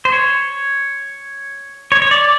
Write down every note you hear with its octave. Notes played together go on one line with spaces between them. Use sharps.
C5
C#5
C#5
C#5
D5